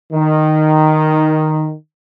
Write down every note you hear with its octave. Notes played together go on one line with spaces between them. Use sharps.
D#3